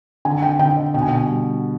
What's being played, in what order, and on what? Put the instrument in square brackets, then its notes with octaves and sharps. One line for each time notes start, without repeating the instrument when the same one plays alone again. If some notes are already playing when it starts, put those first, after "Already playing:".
[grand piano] D3 [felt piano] G#5
[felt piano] G5
[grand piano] D3 [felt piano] G5
[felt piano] D#5
[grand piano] B2 [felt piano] G5
[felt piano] G#5
G5
[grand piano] G3